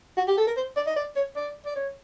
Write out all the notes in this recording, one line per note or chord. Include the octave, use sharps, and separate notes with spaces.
F#4
G4
A4
A#4
C5
D5
D#5
D5
C#5
D5
D5
C#5